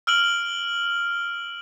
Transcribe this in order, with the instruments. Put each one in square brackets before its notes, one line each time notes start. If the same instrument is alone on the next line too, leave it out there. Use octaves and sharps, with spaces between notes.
[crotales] E6 F6 D7 F#7